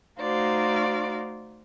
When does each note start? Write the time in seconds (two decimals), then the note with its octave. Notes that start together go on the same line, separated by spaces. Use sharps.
0.20 A3 D#4 F#4 C5 D5 F5